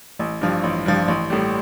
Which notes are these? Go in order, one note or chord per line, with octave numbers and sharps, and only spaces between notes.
A1
G2 F3
A1
G2 F3
A1
A2 G3